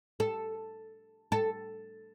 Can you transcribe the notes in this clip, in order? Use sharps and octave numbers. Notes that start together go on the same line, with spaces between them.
A4
A4